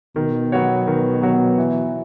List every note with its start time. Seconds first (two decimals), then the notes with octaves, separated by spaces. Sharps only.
0.16 B2 D#3
0.52 F#3 B3 F#4 C#5
0.87 D#3
1.22 F#3 B3 F#4 C#5
1.58 E3